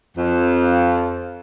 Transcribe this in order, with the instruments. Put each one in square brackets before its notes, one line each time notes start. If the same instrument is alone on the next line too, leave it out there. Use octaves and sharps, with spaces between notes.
[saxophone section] F2